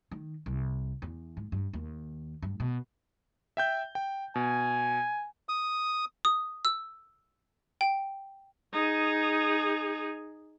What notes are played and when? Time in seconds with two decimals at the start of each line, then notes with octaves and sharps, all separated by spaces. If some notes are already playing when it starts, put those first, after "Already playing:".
0.11 D#3
0.46 C2
1.02 E2
1.37 G#2
1.52 G2
1.73 D#2
2.42 G2
2.60 B2
3.57 E5 G5 G6
3.95 G5
4.35 B2 G#5
5.49 D#6
6.25 D#6
6.65 E6
7.81 G5
8.73 D#4 G#4